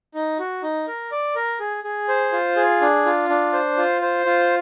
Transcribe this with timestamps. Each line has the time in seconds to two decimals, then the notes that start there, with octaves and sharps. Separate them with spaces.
0.15 D#4
0.39 F#4
0.63 D#4
0.88 A#4
1.12 D5
1.36 A#4
1.60 G#4
1.84 G#4
2.08 C5
2.32 F4
2.56 G#4
2.81 D4
3.06 F4
3.29 D4
3.53 C5
3.77 F4
4.02 C5
4.26 F4